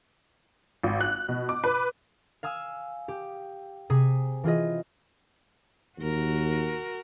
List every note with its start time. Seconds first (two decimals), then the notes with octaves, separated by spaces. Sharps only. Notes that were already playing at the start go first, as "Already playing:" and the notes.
0.83 G#1
1.01 F#6
1.29 B2
1.49 D6
1.64 B4
2.43 F5 G#5 D#6 E6
3.08 G4
3.90 C3 G#4 G#5 D#6 B6 C7
4.44 E3 F4 G#4 D#5
5.99 D#2 F#4 A#4